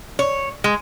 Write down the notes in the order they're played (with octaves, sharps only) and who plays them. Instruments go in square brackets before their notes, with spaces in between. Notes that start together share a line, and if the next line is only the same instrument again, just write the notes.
[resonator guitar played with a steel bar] C#5
G#3